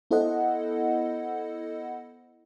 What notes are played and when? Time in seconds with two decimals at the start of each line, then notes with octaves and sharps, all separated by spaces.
0.11 B3 E4 A4 C5 D#5 F#5